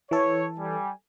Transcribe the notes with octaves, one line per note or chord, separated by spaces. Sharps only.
E3 A4 C#5
G3 G#5